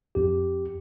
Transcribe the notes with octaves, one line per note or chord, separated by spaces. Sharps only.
F2 G4